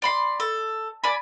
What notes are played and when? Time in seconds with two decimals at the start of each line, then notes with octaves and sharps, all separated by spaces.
0.02 D5 B5 C6
0.40 A4
1.04 D5 G#5 B5